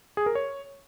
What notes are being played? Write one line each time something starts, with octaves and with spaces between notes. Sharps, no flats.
G#4
A#4
C#5